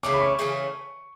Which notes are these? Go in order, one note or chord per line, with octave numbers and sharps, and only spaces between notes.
C#3 E3 A3 C#4 D6
B5
C#6
C#3 E3 A3 C#4